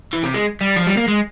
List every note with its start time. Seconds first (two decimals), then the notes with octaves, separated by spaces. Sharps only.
0.13 E3
0.24 C3
0.34 G#3
0.61 G3
0.76 F3
0.87 G3
0.97 A#3
1.08 G#3